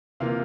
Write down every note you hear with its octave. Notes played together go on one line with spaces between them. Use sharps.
C3 E3 A#3 F4 F5